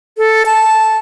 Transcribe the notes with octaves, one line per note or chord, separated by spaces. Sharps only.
A4
A5